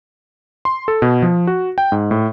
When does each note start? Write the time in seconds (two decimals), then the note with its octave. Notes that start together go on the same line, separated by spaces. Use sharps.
0.65 C6
0.88 A4
1.02 B2
1.22 F3
1.47 F#4
1.78 G5
1.92 G#2
2.11 A2